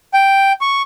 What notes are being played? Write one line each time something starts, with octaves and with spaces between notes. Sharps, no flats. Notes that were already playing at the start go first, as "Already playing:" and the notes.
G5
C#6